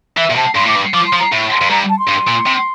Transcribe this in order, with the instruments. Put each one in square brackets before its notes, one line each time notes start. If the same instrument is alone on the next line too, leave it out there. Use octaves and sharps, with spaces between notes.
[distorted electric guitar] E3 [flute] E5
[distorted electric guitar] A#2
[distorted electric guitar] C3 [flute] A5
[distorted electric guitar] G2 [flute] C6
[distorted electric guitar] A2 [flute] D6
[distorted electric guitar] G2
[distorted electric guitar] F3 [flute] D6
[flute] C6
[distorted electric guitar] F3
[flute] A#5
[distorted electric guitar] A2
[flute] C6
[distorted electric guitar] F2
[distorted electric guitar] G2 [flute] A#5
[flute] A5
C6
[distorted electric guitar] G2
A#2
C3